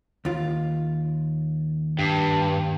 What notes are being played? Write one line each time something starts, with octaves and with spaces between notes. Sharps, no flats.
D#2 F4
G2